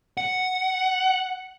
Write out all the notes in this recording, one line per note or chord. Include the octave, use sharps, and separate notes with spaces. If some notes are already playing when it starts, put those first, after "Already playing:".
F#5